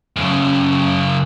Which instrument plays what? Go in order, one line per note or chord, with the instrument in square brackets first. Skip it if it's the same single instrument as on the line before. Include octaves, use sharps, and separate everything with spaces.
[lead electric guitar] F#2 C#3